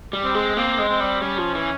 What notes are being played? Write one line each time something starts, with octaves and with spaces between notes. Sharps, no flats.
G3
C4
G#3
A#3 C4
G#3
C4
G3
G3 C#4
F3
E3